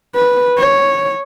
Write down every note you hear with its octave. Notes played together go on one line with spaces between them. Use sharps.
B4
C#5